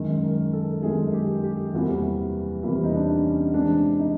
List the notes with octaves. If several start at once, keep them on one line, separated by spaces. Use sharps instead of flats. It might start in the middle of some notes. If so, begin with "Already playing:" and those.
Already playing: F#2 D#3 G#3
A#4
A4
F#2 D#3 G#3 G#4
G4
G4
E2 C3 E3 G3 A#3 F#4
E2 C3 E3 G3 A#3 E4
D#4
D4
C#4
C3 E3 G#3 D4
D#4